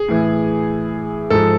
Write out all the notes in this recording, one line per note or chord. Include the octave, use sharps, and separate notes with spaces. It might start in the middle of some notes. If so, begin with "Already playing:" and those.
Already playing: G#4
A2 E3
G#2 F3 A4